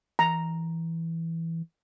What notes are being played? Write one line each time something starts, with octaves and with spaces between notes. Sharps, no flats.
E3 A#5